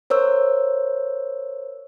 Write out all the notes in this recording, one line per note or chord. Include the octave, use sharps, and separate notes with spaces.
A#4 C5 C#5 E6